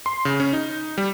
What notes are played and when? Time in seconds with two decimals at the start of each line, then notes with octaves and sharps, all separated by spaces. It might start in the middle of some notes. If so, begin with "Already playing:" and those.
0.06 C6
0.25 C#3
0.40 C#4
0.53 D#4
0.98 G3